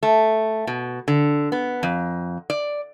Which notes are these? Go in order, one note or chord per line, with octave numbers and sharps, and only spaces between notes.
A3
B2
D3
B3
F2
D5